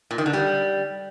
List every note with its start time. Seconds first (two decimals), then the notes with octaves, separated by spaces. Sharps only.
0.11 A#2
0.18 D#3
0.26 D3
0.33 G3